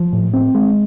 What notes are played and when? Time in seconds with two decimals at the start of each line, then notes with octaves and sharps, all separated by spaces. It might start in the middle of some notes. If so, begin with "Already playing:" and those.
Already playing: F3
0.13 A2
0.34 C4
0.55 G#3